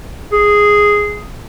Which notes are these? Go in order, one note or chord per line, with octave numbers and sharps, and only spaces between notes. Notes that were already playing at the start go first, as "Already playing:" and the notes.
G#4